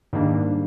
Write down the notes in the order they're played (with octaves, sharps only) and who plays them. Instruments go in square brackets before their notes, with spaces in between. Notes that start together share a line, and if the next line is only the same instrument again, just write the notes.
[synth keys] G#2 D#3 G3 A#3 D4